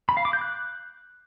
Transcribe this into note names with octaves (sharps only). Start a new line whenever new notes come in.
B5
F5
D6
G6
F#6